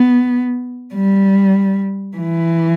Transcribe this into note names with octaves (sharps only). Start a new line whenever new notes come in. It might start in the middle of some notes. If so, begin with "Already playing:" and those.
Already playing: B3
G3
E3